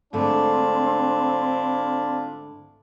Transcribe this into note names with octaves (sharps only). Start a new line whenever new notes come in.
G#2 D3 A3 C4 D4 E4 F4